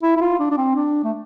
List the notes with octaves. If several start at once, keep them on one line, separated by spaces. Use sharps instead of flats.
E4
E4
F4
D4
D4
C4
D4
A3